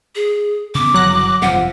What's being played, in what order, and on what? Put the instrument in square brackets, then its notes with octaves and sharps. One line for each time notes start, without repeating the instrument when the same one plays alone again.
[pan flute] G#4
[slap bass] C#3 B3 [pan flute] D6
[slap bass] G1 C#3 E3 [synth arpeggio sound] F#3 F#6 A#6
[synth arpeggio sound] G1 F3 [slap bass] F2 C3 [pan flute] F#5